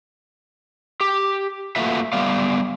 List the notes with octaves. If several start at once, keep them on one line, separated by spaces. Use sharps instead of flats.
G4
A3 A#3 F4 F#4 B4 E5
G3 B3 D5 F5